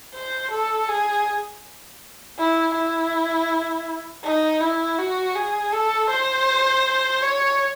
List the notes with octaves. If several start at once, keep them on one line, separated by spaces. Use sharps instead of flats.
C5
A4
G#4
E4
E4
D#4
E4
F#4
G#4
A4
C5
C#5